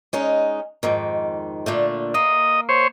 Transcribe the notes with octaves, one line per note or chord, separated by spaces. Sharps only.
G#3 C#4 D#4
F2 G#2 D#3
A#2 D3 A3
A#3 D#5
C5 C#5